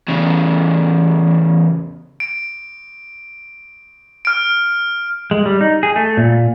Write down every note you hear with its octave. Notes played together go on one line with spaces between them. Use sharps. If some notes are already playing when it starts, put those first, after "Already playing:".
E2 C#3
D7
F6 D7
G#3
G3
D#4
G#4
A3
A#2